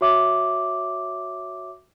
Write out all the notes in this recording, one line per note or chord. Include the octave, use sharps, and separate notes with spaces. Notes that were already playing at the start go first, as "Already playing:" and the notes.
F#4 C#5 E5 D6